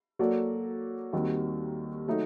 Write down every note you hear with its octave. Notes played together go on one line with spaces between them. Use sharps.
F#3 A#3 F#4 A4 D5
D#2 D#3 G3 C4 F#4
F#3 A3 D#4